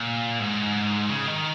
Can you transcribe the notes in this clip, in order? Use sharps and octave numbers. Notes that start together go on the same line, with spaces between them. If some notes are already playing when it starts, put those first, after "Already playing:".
Already playing: A#2
G#2
C#3
D#3